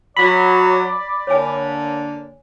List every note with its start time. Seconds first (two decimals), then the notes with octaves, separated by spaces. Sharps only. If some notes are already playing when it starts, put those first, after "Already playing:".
0.17 F#3 D5 B5
1.27 D3 A#3 C#5 G#5